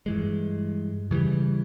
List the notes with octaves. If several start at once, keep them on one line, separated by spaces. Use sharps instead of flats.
G2 E3 G#3
C#3 E3 G3